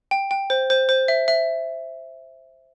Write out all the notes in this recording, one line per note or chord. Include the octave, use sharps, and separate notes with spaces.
G5
G5
C5
C5
C5
E5
E5